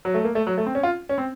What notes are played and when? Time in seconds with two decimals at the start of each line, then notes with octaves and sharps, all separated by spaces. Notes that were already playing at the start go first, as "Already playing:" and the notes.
0.05 F#3
0.14 A3
0.24 A#3
0.35 A3
0.47 F#3
0.58 A3
0.66 C4
0.75 C#4
0.83 F4
1.09 C#4
1.18 C4